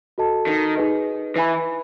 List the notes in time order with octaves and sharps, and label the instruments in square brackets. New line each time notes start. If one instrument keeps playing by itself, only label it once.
[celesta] F#4 A4 D#5 A5
[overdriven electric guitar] D#3
[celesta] D#4 G#4 B4 D#5
[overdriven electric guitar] E3 [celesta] B4 E5 G#5 B5